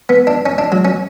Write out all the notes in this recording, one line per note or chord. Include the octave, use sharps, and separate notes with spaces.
B3
D4
C#4
D4
F#3
C#4